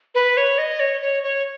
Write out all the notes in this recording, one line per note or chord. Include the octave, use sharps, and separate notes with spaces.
B4
C#5
D#5
C#5
C#5
C#5